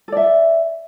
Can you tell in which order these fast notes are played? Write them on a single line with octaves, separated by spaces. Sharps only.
A4 D5 E5